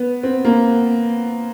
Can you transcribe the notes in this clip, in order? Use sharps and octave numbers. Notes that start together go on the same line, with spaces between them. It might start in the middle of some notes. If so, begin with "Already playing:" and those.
Already playing: B3
C4
A#3